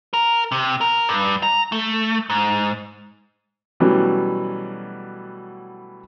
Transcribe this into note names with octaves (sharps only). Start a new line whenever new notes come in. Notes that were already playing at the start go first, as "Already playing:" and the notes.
A#4
C3
A#4
G2
A#5
A3
G#2
B2 E3 F#3 G3 A3 C#4